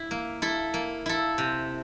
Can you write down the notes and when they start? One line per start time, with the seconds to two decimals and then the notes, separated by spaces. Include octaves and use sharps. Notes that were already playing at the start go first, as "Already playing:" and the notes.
Already playing: E4
0.11 A#3
0.42 E4 A4
0.74 A#3
1.06 E4 A4
1.38 C3